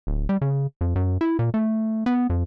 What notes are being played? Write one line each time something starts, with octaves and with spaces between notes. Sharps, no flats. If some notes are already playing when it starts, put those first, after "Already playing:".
D1
G3
C#3
F2
F#2
E4
A#2
A3
B3
F2